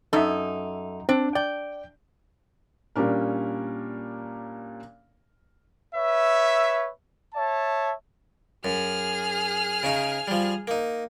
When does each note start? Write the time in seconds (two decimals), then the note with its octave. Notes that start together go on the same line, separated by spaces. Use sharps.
0.13 F#2 D#4 A4 E5
1.09 C4 D4
1.35 D5 G5
2.96 A#2 G3 C#4 D4 A#4
5.95 B4 C#5 E5
7.35 C#5 E5 A5
8.65 F#2 G#4 F6
9.83 C#3 C#4 D#4
10.28 F3 G3
10.67 A#3 D#4